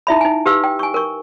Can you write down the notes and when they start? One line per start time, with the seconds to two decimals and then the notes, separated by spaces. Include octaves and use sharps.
0.07 D#4 E4 E5 B5
0.21 D#4 G#5
0.46 G4 B4 F5 E6
0.64 G5
0.79 G#5 C#6
0.94 A#4 C#6